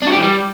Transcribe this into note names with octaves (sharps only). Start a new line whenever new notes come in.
D4
F#4
G4
E3
G3